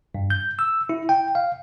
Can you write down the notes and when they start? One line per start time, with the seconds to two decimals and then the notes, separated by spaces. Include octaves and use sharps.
0.15 G2
0.30 G6
0.59 E6
0.89 E4
1.09 G5
1.35 F5